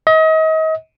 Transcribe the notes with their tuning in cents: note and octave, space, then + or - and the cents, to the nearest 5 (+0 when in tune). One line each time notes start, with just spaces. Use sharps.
D#5 +35